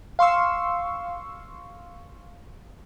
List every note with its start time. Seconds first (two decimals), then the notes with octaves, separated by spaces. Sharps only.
0.19 F5 C6 C#6 E6